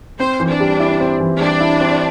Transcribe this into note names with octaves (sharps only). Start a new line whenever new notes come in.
C4 C5
E3
D4
G3
E4
C4
E3
G3 D4
E4
C4